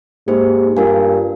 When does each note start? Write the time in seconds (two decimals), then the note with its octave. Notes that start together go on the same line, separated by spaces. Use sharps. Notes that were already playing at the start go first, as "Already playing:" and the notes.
0.27 G#2 A#3 D#4 G4 C5
0.76 G2 F4 A#4 F5 G#5